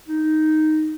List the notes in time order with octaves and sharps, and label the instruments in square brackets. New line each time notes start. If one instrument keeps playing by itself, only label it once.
[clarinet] D#4